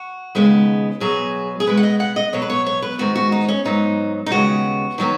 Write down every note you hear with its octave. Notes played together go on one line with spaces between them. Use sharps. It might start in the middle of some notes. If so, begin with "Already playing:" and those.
Already playing: F#4
D#2 C#3 G#3 B3
B2 F#3 B3 G#4
G#4
B2 G#3 B3 B4
F#5
D#5
F#5
D#5
B2 F#3 B3 C#5
B4
C#5
C#5
B4
G#2 D#3 G#3 B3 F#4
F#4
D#4
C#4
G#2 F#3 B3 D#4
D#4
D#2 C#3 G#3 B3 F#4
D#3 F#3 B3